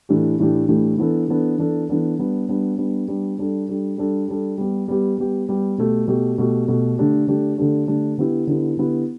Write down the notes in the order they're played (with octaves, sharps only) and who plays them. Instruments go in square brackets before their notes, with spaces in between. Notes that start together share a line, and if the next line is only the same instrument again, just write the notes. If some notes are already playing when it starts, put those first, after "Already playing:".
[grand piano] A2 E3 A3 D4 G4
A2 E3 A3 D4 G4
A2 E3 A3 D4 G4
E3 B3 D4 A4
E3 B3 D4 A4
E3 B3 D4 A4
E3 B3 D4 A4
G3 B3 D4
G3 B3 D4
G3 B3 D4
G3 B3 D4
G3 D4 A4
G3 D4 A4
G3 D4 A4
G3 D4 A4
G3 B3 G4
G3 B3 G4
G3 B3 G4
G3 B3 G4
B2 A3 G4
B2 A3 G4
B2 A3 G4
B2 A3 G4
D3 A3 D4 G4
D3 A3 D4 G4
D3 A3 D4 G4
D3 A3 D4 G4
D3 B3 E4 G4
D3 B3 E4 G4
D3 B3 E4 G4